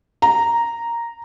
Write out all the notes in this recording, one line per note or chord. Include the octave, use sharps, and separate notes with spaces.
A#5